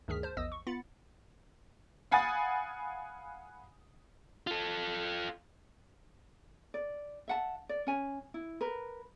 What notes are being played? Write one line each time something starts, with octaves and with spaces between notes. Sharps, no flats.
D2 G2 D#3 G#4 F6 B6
C5 A5
A#1 E2 D#5 D#6 E6
C#6
B3 F4 B5 A6 C#7
F5 F#5 G#5 B5 D#6 A6
F4 A4
D5
E5 F#5 A5
D5
C#4 G#5
E4
A#4 B4